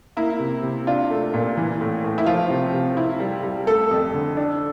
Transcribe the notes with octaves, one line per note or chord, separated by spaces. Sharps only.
A#3 E4
C3
C3
D4 F4
A3
A#2
E3
A2
A2
E4
F3 F4
C3
C3
E4
G3
G3
A3 A4
F2
D3
D4